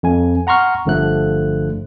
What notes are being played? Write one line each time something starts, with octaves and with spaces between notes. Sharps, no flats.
F2 G#5
F#5 A#5 C6 C#6 F6
G1 G2 D3 F3 A3 F#6